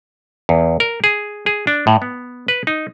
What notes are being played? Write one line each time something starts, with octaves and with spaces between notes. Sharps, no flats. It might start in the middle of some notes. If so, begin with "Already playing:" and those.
E2
A#4
G#4
G#4
D4
A2
B3
B4
D#4